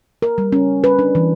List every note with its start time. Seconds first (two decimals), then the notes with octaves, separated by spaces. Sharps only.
0.22 A#4
0.38 G3
0.52 C#4
0.84 B4
0.99 D4
1.15 E3